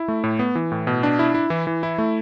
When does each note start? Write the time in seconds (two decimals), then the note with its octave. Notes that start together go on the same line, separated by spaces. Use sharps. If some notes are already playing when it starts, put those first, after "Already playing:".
Already playing: E4
0.08 A3
0.24 A2
0.39 B3
0.55 E3
0.72 A2
0.87 B2
1.03 D4
1.19 E4
1.34 E4
1.50 E3
1.67 E3
1.83 E4
1.98 A3